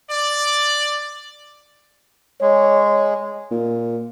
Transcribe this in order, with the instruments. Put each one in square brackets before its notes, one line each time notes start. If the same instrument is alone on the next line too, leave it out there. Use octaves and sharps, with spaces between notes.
[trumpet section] D5
[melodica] G#3 [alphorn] C#5
[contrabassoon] A#2